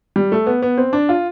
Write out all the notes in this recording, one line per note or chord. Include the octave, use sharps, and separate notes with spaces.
G3
A3
B3
B3
C4
D4
F4